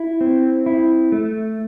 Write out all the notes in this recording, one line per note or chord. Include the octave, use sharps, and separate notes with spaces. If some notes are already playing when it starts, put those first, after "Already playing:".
Already playing: E4
C4
E4
A3